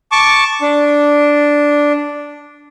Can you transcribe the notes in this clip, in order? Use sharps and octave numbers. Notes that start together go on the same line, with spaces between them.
A5 C#6 D6
D4